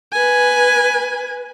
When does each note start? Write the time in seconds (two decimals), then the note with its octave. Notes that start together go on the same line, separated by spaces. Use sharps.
0.13 B4 G#5